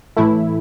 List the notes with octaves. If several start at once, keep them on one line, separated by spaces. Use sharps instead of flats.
A2 E3 A3 E4